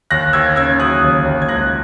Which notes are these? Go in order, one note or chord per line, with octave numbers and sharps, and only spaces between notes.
D#2 F#6 A#6
D#2 E6 G#6
C#3 E6 G#6
F#3 D#6 F#6
D#2
D#2
G#6
C#2 F#6 A#6